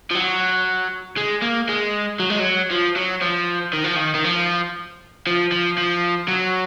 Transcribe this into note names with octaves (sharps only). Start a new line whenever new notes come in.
F3
F#3
G#3
A#3
G#3
F#3
G#3
F#3
F3
F#3
F3
D#3
F3
D#3
D#3
F3
F3
F3
F3
F#3